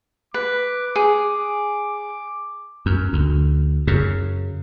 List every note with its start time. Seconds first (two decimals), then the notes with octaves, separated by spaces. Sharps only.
0.34 B4 D6
0.96 G#4
2.86 F#2
3.13 D2
3.87 F#2 C#3